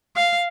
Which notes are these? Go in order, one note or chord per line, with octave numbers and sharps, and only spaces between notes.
F5